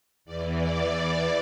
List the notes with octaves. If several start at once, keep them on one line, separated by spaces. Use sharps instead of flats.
E2 E3 D5
D5
D5